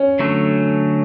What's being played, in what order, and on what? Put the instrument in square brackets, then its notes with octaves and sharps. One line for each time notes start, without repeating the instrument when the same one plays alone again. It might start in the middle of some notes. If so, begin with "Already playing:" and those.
Already playing: [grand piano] C#4
[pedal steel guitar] D3 F#3 A3